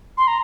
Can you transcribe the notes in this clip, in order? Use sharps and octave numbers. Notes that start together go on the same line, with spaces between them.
C6
A#5